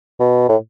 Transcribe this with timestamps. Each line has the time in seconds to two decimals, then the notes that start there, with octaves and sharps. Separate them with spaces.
0.20 B2
0.49 A2